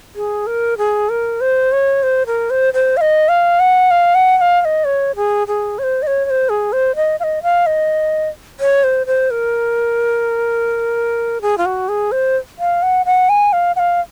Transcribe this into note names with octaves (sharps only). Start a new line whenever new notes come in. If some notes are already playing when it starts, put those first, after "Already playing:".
G#4
A#4
G#4
A#4
C5
C#5
C5
A#4
C5
C5
F5
D#5
F5
F#5
F5
F#5
F#5
F5
F5
D#5
C#5
G#4
G#4
C#5
C5
D#5
C#5
C#5
C5
G#4
C5
D#5
F5
D#5
F5
D#5
C#5
C5
C5
A#4
G#4
F4
F#4
G#4
C5
F5
F#5
F#5
G#5
F5
F#5
F5